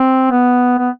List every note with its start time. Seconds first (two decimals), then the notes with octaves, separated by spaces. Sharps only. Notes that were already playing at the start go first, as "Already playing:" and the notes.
Already playing: C4
0.31 B3
0.79 B3